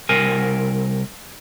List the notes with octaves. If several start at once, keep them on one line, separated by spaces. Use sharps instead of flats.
C2 A#4 G#5